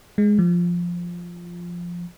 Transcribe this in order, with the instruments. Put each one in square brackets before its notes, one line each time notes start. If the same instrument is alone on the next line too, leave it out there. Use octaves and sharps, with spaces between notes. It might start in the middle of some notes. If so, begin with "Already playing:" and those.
[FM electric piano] G#3
F3